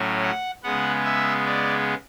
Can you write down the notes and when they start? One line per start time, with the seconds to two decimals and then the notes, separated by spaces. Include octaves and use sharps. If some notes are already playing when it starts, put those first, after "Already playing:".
Already playing: A2 F#3 C#4
0.23 F#5
0.64 C#3 G#3 B3 F#5
1.04 E5
1.46 D5